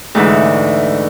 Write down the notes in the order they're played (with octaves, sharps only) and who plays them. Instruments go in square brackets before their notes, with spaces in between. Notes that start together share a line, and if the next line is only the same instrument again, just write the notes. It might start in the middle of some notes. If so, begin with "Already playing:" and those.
[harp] D2 G#2 E3